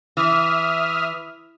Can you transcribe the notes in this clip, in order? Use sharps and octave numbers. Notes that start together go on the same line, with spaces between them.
E3 E5 D#6 F6